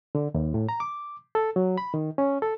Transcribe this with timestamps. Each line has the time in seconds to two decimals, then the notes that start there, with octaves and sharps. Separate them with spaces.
0.15 D3
0.34 D#2
0.54 A2
0.69 A#5
0.80 D6
1.35 A4
1.56 F#3
1.78 B5
1.94 D#3
2.18 C#4
2.42 A4